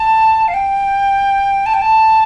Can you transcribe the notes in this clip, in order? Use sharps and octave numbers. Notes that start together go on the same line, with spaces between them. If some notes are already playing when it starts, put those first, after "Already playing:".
Already playing: A5
F5
G5
A5
G5
A5